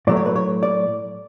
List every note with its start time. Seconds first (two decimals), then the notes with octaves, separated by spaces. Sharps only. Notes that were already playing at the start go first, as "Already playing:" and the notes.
0.07 A2 F#3 A3 D5
0.16 C#5
0.26 B4
0.36 C#5
0.63 D5